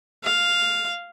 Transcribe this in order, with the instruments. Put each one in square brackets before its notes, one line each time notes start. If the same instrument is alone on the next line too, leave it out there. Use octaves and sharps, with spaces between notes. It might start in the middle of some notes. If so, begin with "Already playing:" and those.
[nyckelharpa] F5